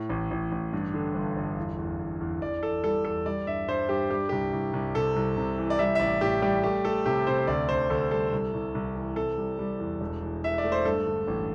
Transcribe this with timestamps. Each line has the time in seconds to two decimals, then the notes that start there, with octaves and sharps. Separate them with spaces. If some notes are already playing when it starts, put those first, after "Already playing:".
Already playing: A2
0.10 A1
0.31 A1
0.52 A1
0.73 G2
0.94 D3
1.15 G1
1.36 G1
1.58 E2
1.78 E2
1.99 E2
2.21 E2
2.42 E2 D5
2.62 E2 A4
2.84 G3 A4
3.05 E2 A4
3.26 G3 D5
3.47 G2 E5
3.68 G2 C5
3.89 G2 G4
4.10 G3 G4
4.29 C2 G4
4.53 C2
4.73 C2
4.95 C3 A4
5.16 C2
5.37 C3
5.58 E3
5.70 D5
5.79 G3 E5
5.95 E5
6.00 A1 D5
6.21 A2 G4
6.42 G3 G4
6.63 A3 G4
6.85 A3 A4
7.06 C3 G4
7.27 C3 C5
7.38 C5
7.47 D2 D5
7.69 D2 C5
7.90 D2 A4
8.11 G3 A4
8.33 C2
8.54 C2
8.75 C2
8.95 E3
9.16 C3 A4
9.38 G3
9.59 G3
9.80 E2
10.01 E1
10.22 E3
10.43 E3 E5
10.58 D5
10.64 A3
10.72 C5
10.85 G2 A4
11.06 D3
11.28 A1